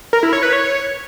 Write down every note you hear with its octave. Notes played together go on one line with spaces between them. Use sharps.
A#4
E4
C#5
B4
C#5